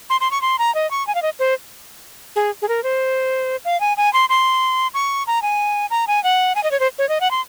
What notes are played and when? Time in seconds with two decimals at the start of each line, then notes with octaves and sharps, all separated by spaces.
0.10 C6
0.21 C6
0.31 C#6
0.42 C6
0.59 A#5
0.75 D#5
0.91 C#6
1.07 G#5
1.15 F5
1.22 D#5
1.40 C5
2.36 G#4
2.62 G#4
2.69 A#4
2.84 C5
3.65 F5
3.80 G#5
3.97 G#5
4.13 C6
4.29 C6
4.94 C#6
5.27 A#5
5.42 G#5
5.90 A#5
6.08 G#5
6.24 F#5
6.55 G#5
6.63 D#5
6.71 C#5
6.80 C5
6.99 C#5
7.09 D#5
7.21 F#5
7.31 C6